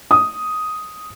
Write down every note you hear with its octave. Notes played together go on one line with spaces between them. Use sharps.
D#6